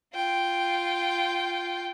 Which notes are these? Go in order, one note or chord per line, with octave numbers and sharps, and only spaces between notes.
F4 G5